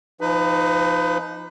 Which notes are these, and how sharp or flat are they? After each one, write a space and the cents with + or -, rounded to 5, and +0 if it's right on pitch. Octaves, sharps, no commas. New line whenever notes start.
F3 -20 D#4 +0 B4 +25